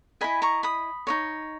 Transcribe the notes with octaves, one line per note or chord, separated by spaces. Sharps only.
E4 A#4 D#5 G#5 B5
A#5 C#6
B5 D#6
D#4 A#4 C#5